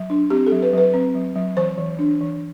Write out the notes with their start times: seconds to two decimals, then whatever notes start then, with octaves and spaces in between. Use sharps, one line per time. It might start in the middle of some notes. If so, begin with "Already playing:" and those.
Already playing: F#3
0.10 D4
0.30 C4 G4
0.47 A4
0.52 F#3
0.62 B4
0.73 F#3 B4
0.94 C4
1.15 F#3
1.36 F#3
1.57 E3 C5
1.78 E3
1.99 D4
2.20 E3